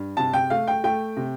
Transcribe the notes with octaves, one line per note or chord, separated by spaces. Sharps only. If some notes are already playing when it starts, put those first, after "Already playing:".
Already playing: G2
C3 A5
G5
A3 F5
G5
A3 G5
C3